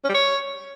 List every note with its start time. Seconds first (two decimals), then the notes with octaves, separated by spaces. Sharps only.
0.04 C#4
0.09 G3
0.14 C#5